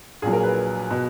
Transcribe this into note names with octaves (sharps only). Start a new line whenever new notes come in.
A#1 A#2 F#3 G#4
A#4
B4
B2